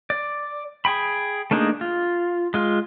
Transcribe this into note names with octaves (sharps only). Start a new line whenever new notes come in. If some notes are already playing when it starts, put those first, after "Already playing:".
D5
G#4 G5 B5
A3 A#3 D4 D#4 G#4
F4
G#3 F4